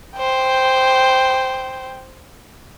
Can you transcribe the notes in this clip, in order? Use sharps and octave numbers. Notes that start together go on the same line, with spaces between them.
C5 G5